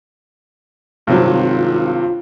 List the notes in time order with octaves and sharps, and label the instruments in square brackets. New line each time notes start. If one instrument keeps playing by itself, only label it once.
[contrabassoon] G#1 [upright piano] G2 C3 F#3 [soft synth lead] F4